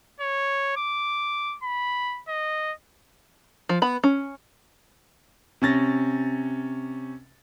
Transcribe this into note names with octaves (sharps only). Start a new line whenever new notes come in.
C#5
D6
B5
D#5
F3
B3 B5
C#4
C3 C#4 A6 A#6